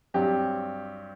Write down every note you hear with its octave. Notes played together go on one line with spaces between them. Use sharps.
G2 F#3 C4 G4